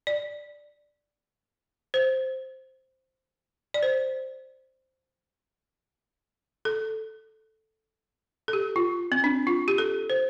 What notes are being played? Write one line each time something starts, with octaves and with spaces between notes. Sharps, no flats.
D5
C5
D5
C5
A4
A4
G4
F4
C4
D4
F4
G4
A4
C5